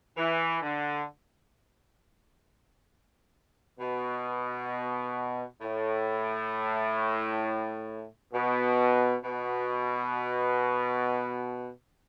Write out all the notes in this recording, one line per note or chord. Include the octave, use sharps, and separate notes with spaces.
E3
D3
B2
A2
B2
B2